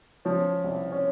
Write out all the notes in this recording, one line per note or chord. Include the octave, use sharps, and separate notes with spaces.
F3 C#4
C2
C#4